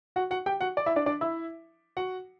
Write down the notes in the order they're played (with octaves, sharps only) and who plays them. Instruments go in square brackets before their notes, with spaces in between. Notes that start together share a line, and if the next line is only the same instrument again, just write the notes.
[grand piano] F#4 F#5
F#4 F#5
G4 G5
F#4 F#5
D5
E4 E5
D4 D5
D4 D5
E4 E5
F#4 F#5